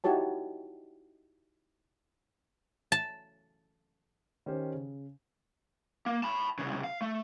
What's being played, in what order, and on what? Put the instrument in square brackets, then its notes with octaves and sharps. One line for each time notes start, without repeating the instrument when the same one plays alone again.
[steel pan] D#4 E4 F#4 G4 C#5 A5
[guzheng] A5
[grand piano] D#3 C#4 G4 C5
C#3
[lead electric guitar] A#3
A5 B5
C2 C#3
F5
A3